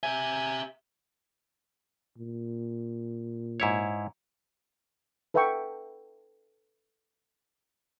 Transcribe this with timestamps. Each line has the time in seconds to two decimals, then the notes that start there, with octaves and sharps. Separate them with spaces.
0.03 G4 E5 G#5
2.18 A#2
3.60 G#2 E4 C#5
5.34 A4 B4 E5 F#5 G5 C#6